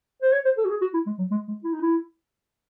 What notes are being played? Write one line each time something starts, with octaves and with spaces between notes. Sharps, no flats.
C5
C#5
C5
A4
F#4
G#4
F#4
E4
G#3
F#3
G#3
G#3
E4
D#4
E4